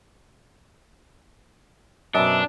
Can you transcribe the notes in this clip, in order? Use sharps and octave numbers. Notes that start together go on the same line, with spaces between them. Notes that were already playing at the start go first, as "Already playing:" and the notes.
F#2 B2 D4 E5